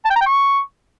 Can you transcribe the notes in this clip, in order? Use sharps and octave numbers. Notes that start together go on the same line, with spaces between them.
A5
G5
A#5
G5
C#6